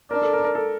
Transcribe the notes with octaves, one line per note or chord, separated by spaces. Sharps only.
D4 A#4
A4
A#4
A#4
A4